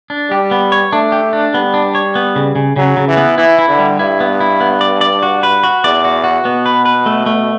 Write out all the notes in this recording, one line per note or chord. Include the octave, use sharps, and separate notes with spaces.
D4
G3 G4
B3
C#5
A3 D4
G4
D4
G3 B3
D4
C#5
B3
C#3
C#3
C#3 F#3
C#3
E3
B3
E3 E4
E4
D3
G3
G2 E4
B3
E4
B3
D5
D5
F#4
B4
F#4
E2 D5
F#4
F#4
B2 B3
B4
B4
A3
A3